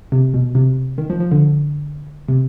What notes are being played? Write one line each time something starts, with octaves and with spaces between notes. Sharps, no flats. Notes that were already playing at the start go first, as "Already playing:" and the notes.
C3
B2
C3
D#3
F3
F3
D3
C3